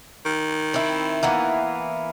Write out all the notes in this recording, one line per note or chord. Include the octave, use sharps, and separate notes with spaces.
D#3
C4 E4
E3 A#3 B3